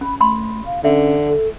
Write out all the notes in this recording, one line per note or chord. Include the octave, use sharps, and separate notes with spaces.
C#4 B5
A3 B5 C6
F5
D3 C#4 E5
A4